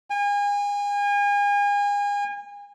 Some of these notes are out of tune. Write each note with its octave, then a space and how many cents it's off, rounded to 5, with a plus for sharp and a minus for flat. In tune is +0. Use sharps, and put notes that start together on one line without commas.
G#5 -35